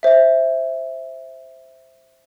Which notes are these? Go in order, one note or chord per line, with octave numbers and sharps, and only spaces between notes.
C5 E5